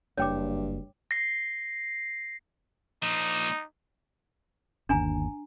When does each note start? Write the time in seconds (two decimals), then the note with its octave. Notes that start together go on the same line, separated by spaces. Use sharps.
0.17 F#1 G2 C#5 G5 D6
1.11 A#6 C7
3.03 A#2 F3 D#4
4.89 G1 D#2 D4 G#5 A#5